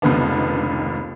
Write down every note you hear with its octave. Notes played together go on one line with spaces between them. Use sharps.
F1 C#2 D#3 B3 D4